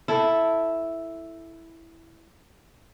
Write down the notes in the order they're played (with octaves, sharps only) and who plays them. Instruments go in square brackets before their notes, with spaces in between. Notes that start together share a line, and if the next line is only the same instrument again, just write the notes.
[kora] E4 A4